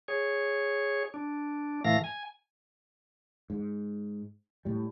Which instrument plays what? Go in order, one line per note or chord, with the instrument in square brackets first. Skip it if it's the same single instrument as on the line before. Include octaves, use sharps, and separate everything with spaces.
[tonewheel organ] G#4 C#5
D4
A2 E3 A3 F5 A#6
G#5
[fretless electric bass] G#2
A2 G3